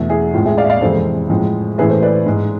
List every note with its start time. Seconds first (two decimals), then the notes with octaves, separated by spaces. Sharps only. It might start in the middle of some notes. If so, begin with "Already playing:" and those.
Already playing: E2 B2 A3
0.10 E4 G#4
0.34 A2 G#3 F4
0.45 E4 G#4
0.58 D5 F5
0.64 E5
0.70 D5 F5
0.81 F2 C3 E3 G#3 A4 C5
1.29 A2 F3 G#3
1.78 A2 E3 A3 G#4 B4
1.90 A4 C5
2.02 B4 D5
2.26 G#2 G#3